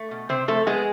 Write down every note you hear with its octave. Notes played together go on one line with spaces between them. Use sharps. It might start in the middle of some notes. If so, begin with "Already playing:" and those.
Already playing: A3
B2
C3 C4 C5
F3 A3 A4
G#3 B3 G#4